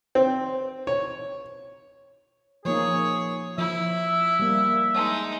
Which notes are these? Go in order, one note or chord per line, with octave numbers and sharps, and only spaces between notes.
C4
C#5
F3 A#3 D#4 G#4 C#5
F3 E4 E5
G3 A#3
G#3 D#4